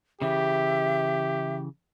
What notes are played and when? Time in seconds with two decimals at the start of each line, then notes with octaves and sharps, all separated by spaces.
0.22 C#3 E3 G4 E5